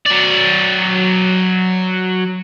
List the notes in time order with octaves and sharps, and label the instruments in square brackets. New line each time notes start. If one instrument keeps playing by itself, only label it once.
[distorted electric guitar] F#3 D5